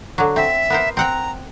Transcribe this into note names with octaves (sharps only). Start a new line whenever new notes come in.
D3 F#3
C4 E5
B3 A#4 C5
C4 F#5 G5 A#5